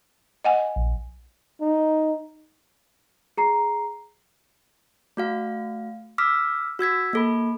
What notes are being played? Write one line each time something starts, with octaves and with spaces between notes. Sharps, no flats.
D#5 F#5 G#5
A#1
D#4
G#4 A#5 C7
A3 F#4 F5
D6 E6 F6 B6
F#4 E6 G#6 B6
A#3 A4 B5